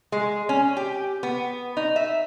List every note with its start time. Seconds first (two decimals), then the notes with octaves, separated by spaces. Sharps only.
0.12 G#3
0.49 C#4
0.77 G4
1.23 B3
1.77 D#4
1.96 E5